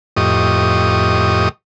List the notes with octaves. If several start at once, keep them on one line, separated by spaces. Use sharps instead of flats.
F2 A2 G4 D#5 C#6 D#6